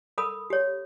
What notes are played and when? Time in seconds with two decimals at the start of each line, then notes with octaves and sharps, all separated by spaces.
0.18 A4 A#4 B5 D#6
0.50 G4 C#5